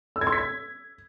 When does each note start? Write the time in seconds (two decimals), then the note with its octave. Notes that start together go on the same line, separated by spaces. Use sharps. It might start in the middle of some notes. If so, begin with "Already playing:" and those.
0.16 E6
0.21 G#6
0.27 C6
0.32 B6
0.38 G#6